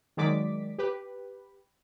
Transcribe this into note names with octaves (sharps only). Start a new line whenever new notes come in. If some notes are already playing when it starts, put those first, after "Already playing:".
D#3 F#3 G#3 D5 D6 B6
G4 B4